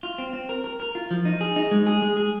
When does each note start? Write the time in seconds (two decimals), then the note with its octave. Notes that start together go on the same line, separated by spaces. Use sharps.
0.03 F4
0.18 C4
0.33 C4
0.49 A#4
0.64 A#4
0.80 A#4
0.95 F4
1.11 F3
1.25 D#4
1.41 G#4
1.56 D#4
1.71 G#3
1.87 G#4
2.02 G#3
2.17 G#4